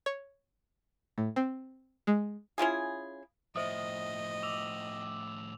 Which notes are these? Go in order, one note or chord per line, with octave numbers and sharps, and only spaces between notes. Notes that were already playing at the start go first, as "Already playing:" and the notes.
C#5
A2
C4
G#3
C#4 E4 F4 G#4
A2 F3 C5 D#5 E5 D#6
D6 E6 F7